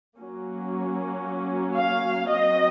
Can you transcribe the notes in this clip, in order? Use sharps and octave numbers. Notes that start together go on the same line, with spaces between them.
F#3 A#3 C#4
F5
F#3 C4 D#5